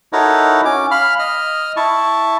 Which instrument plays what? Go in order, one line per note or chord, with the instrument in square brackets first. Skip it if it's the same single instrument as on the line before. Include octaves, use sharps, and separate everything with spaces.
[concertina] D#4 E4 F#4 A4 A#4 C#5
C#4 D6
F5 B5 F6
D#5 F6
E4 A5 C#6